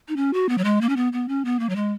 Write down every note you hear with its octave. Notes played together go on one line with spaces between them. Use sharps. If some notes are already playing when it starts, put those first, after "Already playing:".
D#4
C#4
F#4
B3
F#3
G#3
A#3
C#4
B3
B3
C#4
B3
A#3
F#3
G#3